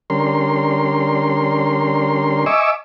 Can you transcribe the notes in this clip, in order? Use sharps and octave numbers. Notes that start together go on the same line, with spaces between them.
D3 G3 C#4 A#4 C6
D#5 E5 G#5 C#6 D6 E6